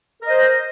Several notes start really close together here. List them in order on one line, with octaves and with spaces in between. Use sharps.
A#4 D#5 C5